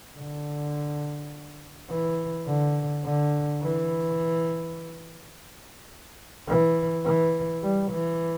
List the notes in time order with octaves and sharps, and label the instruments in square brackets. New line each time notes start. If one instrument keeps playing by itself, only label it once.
[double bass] D3
E3
D3
D3
E3
E3
E3
G3
E3